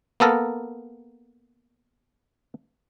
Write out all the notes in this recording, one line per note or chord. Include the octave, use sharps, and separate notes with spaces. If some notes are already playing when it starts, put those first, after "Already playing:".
A#3 B3 A4 A#4